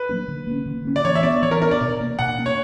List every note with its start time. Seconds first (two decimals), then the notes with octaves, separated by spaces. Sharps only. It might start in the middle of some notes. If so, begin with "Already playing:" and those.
Already playing: B4
0.09 F#3 A#3 D4
0.28 D3
0.47 A#3 C#4
0.66 D3
0.85 A#3 C#4
0.96 D5
1.05 E3 C#5
1.15 E5
1.23 B3 D4 D5
1.42 E3 C#5
1.51 A#4
1.62 B3 D4 A#4
1.71 D5
1.81 B2
2.00 A#3 D4
2.19 B2 F#5
2.38 A#3 D4
2.46 C#5